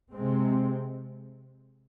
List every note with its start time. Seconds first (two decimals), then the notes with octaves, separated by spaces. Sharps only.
0.14 C3 G#3 C4